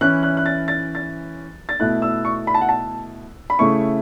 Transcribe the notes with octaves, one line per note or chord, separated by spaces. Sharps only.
E3 C#4 E4 F#6
F#6
F#6
A6
A6
A6
A6
B2 A3 E4 F#6
E6
C#6
B5
A5
F#5
A5
B5
C#3 A3 E4 C#6